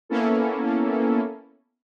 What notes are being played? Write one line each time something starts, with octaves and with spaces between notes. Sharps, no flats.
A#3 B3 C#4 E4 A4